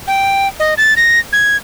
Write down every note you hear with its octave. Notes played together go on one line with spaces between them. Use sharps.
G5
D#5
A6
A#6
G#6